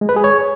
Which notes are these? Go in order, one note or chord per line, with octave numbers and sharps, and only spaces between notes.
G#3
B4
G#4
C#5